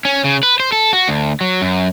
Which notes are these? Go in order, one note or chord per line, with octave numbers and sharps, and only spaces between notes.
C#4
C#3
B4
C5
A4
F#4
D2
F#3
F#2